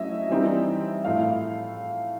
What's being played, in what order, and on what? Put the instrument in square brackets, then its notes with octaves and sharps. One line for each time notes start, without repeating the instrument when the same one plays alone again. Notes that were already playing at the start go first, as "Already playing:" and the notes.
Already playing: [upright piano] F#3 A3 C#4 E4 D#5 E5
E3 G3 C4 D#4
A2 F3 A3 F5